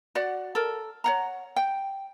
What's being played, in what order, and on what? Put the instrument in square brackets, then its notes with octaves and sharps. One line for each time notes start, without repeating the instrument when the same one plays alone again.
[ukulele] F#4 D5 F#5
A4 A#4
C#5 F#5 A#5
G5